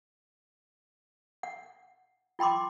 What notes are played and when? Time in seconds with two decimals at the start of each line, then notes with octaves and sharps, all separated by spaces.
1.43 F#5
2.39 F4 G5 B5 C6 D6